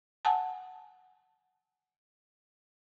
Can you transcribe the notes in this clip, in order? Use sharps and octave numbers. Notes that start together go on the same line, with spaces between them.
F#5 G#5 A5